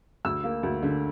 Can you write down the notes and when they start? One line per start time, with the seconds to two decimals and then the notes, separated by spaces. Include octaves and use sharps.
0.25 D2 E6
0.44 A#3
0.63 D2
0.83 D3